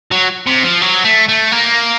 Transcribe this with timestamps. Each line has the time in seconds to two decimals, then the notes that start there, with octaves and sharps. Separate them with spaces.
0.11 F#3
0.47 C3
0.64 F3
0.82 F#3
1.04 A3
1.29 A3
1.52 A#3